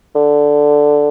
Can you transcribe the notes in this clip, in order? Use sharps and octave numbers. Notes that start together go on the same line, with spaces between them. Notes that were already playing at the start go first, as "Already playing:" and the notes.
D3